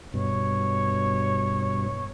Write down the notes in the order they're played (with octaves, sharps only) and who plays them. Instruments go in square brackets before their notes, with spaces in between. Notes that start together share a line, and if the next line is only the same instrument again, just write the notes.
[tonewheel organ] G2 B2 [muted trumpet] C#5